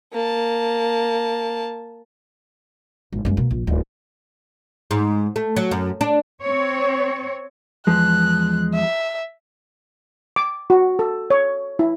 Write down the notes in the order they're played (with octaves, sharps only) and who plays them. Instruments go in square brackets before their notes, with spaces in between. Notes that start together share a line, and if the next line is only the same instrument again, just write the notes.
[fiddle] A#3 A5
[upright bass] G#1
F#2 G#3
B2 A#3
A#1
D1
[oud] G#2
A3
F#3
F#2
D4
[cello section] C4 C#5
[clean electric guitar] E2 F3 G#3 [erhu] F#6
[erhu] E5
[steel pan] D6
F#4
A4
C#5
E4